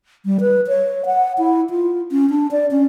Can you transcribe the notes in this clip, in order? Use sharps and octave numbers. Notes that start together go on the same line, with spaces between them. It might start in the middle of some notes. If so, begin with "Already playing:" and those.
G3
B4
C#5
F#5
E4
F4
C#4
D4
D5
C#4